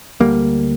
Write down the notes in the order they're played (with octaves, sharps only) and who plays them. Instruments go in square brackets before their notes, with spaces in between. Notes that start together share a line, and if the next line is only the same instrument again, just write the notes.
[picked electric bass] D2 D3 G3 A#3